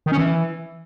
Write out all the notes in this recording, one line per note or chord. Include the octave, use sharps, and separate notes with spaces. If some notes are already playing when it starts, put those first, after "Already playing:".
D#3
C#4
E3